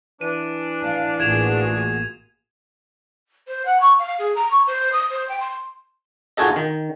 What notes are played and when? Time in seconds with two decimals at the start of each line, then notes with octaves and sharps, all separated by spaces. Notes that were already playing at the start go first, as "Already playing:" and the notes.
0.21 E3 D4 D#7
0.83 F5
1.20 A1 A#3 F4 F#4 G#4 G#6 E7 F7
3.47 C5
3.65 F#5
3.80 C#6
3.99 F5
4.19 G#4
4.35 A#5
4.51 C#6
4.67 C5
4.93 D#6
5.10 C5
5.29 G5
5.40 C6
6.37 D#4 F4 F#4 G#4 A4 D#5
6.56 D#3